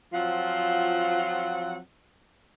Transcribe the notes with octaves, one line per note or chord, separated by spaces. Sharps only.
F3 F#3 C4 F4 F#5